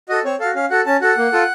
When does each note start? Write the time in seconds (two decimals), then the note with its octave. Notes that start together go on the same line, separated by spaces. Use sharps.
0.09 F#4 A4 D#5
0.25 C4 C#5
0.40 F#4 A4 F5
0.55 C#4 F5
0.70 F#4 A4 F#5
0.86 C#4 A5
1.01 F#4 A4 F#5
1.17 A#3
1.33 F4 A4